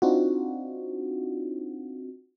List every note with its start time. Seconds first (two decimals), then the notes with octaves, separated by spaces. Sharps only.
0.02 C4 D4 D#4 F4 F#4